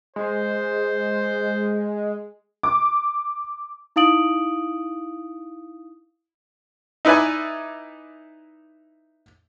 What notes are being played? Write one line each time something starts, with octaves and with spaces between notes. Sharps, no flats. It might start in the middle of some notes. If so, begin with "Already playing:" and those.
G#3 C5
D6
D#4 E4 F5 D#6 D7 F#7
D#4 E4 B4 D5 G#5